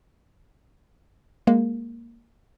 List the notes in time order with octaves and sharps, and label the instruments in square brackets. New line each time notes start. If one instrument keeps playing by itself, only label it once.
[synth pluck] G#3 A#3